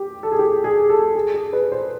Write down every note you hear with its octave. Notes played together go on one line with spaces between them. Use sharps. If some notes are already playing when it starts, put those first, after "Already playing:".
Already playing: G4
A4
G#4
G4
G#4
A4
G#4
G#4
B4
C5